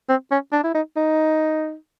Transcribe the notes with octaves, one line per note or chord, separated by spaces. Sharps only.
C4
C#4
D4
E4
D#4
D#4